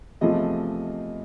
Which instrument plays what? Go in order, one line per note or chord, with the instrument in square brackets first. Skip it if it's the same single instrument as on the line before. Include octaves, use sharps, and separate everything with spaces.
[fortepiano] E2 C3 F3 A3 D#5